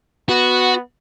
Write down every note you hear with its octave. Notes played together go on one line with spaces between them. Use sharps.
B3 F#4